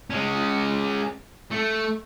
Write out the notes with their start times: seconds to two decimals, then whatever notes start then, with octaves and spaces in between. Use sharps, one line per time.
0.10 G#3 C#4
1.51 A3